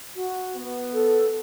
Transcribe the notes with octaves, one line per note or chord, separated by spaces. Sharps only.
F#4
B3
A4